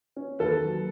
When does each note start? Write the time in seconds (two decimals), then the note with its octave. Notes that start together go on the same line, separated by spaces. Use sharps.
0.16 C#4
0.39 D#2 A4 B4
0.63 F#3